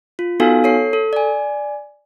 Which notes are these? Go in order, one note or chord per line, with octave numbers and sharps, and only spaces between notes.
F4
B3 D#4 F#4 A4 F5 G#5
A4 C#5 C7
A4
D5 G#5